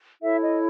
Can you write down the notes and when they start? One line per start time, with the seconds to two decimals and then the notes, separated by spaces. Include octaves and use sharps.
0.21 E4 A4 C#5 E5
0.42 D#5